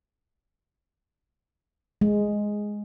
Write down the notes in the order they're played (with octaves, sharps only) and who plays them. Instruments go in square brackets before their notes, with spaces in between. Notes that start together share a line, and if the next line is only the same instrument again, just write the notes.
[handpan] G#3